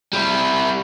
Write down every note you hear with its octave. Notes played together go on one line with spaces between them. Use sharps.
G3 E4